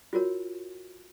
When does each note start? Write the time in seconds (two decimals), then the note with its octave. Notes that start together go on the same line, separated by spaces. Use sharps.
0.13 F4 F#4 A#4 C#5